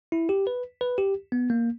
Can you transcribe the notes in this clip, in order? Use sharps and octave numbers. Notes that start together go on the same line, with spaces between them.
E4
G4
B4
B4
G4
B3
A#3